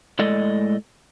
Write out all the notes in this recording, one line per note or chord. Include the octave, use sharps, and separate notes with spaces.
A2 G#3 A4 D5 D#5